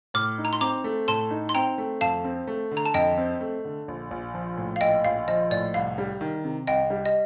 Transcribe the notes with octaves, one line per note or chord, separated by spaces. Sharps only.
A2 D6 F6
D#4
A#5
C6
C4 A#5 D6
A3
A2 A5 C6
D#4
C6
C4 G5 A#5
A3
F2 F5 A5
C4
A3
D3
A#5
A5
F2 D#5 G5
C4
A3
D3
A#1
A#1
F3
A2
F5
A#1 D#5 G5
A#1 F5
F3 D#5
A2 D5
C2 F5
G3
D#3
C3
C2 D#5 G5
G3
D#5